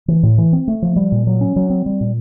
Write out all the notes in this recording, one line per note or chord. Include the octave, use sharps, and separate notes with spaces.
E3
A2
E3
C4
A3
F3
G3
A#2
F#3
C#4
F#3
C4
G3
A#2